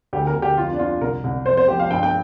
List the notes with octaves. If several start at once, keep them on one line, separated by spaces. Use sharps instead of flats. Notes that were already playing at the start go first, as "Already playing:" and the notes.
D2 G4
A#4
D2
G4
F2 F4
D4
F2 F4
C2 A#4
C2
F2 C5
C5
F3 G4
F5
G2 G5
G5